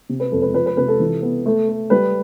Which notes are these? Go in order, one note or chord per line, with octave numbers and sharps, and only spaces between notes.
C3
B4
F2 A4
B4
F3 B4
B4
C3 B4
A4
E3
B3
A3
A3
G3 B4